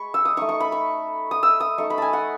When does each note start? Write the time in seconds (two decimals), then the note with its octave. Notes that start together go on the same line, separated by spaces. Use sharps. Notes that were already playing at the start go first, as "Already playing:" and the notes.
Already playing: G#3 B5 C#6
0.14 E6
0.25 D#6
0.37 A3 D#4 C#6
0.49 C#6
0.60 B5
0.72 C#6
1.31 D#6
1.43 E6
1.60 D#6
1.78 A3 D#4 C#6
1.90 B5
1.98 G#5 A5
2.13 F#5